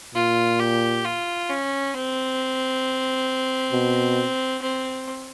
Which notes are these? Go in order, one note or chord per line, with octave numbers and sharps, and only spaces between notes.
A#2 F4
G4
F4
C#4
C4
B2
C4